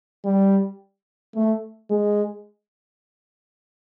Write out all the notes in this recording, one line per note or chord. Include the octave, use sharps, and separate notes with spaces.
G3
A3
G#3